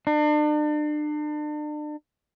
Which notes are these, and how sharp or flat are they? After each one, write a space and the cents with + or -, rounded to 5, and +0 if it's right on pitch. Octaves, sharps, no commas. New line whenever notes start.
D4 +40